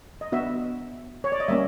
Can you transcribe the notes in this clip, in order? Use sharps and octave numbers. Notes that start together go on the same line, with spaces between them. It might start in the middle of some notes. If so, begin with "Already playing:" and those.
D#5
B3 D4 F#4 E5
C#5
D5
D#5
G3 A#3 C#4 E5